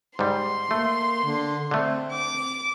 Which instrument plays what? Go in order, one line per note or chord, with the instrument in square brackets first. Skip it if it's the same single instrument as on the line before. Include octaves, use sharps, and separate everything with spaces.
[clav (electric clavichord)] G#2 G3 [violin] C6
[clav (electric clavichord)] A3 [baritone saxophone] A#3
[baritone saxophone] D3
[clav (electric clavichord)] D3 A3 [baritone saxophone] C4
[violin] D6